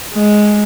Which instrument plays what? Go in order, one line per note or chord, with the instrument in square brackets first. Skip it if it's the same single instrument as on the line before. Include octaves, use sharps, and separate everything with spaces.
[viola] G#3